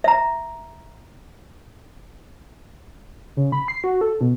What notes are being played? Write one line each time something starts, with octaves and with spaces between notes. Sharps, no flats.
E5 A#5
C#3
B5
C7
F#4
A4
B2